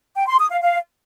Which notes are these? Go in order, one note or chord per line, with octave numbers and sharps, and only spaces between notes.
G5
C6
D#6
F5
F5